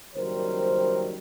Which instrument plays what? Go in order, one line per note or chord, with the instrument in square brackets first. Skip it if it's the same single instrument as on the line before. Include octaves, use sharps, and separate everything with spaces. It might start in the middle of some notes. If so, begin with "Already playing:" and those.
[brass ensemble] F#1 F#2 D#3 G3 A#4 C5